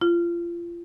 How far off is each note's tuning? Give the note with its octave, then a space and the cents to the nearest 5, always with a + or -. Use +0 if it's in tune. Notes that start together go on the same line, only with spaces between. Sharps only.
F4 -30